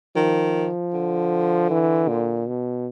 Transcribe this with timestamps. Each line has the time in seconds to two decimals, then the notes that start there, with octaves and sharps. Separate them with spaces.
0.16 D#3 F3
0.93 D3
1.70 E3
2.08 A#2
2.47 B2